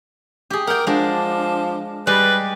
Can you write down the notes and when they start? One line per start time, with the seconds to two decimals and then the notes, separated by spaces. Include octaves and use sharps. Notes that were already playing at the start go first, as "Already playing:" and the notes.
0.50 G4 G#4
0.67 A#4 F#5 G5
0.87 F3 G#3 D4
2.07 G3 G#3 B4 D5